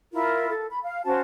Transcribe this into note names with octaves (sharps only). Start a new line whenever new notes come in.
E4 F4 A#4
A4
B5
F5
C#4 F#4 C5 A5